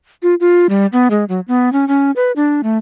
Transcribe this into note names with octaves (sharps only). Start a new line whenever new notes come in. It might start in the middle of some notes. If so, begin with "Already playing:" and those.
F4
F4
G3
B3
G#3
F#3
B3
C#4
C#4
B4
D4
A3